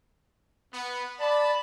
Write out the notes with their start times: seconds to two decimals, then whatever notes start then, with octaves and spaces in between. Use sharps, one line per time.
0.73 B3
1.20 D5 A5 B5